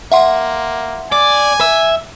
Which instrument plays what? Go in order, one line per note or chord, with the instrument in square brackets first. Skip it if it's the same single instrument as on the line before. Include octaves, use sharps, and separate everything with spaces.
[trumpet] A#3 [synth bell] E5 F#5 C6
[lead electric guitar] D5 [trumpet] G#5 [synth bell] D6
[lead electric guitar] E5